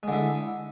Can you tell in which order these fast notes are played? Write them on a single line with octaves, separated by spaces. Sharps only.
G#3 D3 E4